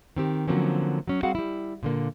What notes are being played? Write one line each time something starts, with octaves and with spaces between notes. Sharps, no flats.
D#3 C4 G4
D3 F3 F#3 A#3 C4 C#4
F#3 C#4
G3 C4 F#4 G#4 F5 F#5
G3 E4
A#2 D3 A#3